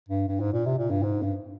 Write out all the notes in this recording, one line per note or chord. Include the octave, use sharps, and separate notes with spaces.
G2
G2
G#2
A#2
C3
A#2
G2
G#2
G2